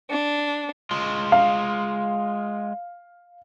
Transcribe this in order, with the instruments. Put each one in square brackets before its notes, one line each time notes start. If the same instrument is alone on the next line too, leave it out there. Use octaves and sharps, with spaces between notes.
[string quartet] D4
[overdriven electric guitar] G#3 F4
[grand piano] F5